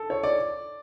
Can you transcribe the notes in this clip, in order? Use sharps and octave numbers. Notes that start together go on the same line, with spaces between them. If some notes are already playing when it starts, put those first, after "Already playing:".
Already playing: A4
C#5
D5